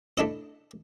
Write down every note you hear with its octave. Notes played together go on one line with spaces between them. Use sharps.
A3 D4 E4 D#5